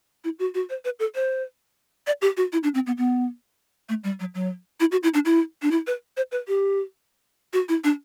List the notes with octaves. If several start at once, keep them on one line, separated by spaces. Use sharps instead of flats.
E4
F#4
F#4
C5
B4
A4
C5
D5
G4
F#4
E4
D4
C4
B3
B3
A3
G3
F#3
F#3
E4
F#4
E4
D4
E4
D4
E4
B4
C5
B4
G4
F#4
E4
D4